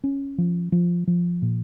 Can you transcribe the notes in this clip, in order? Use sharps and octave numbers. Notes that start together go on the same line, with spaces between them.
C#4
F3
F3
F3
A#2